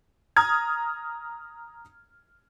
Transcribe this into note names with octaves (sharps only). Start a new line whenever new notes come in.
A#5 D#6 F6 G#6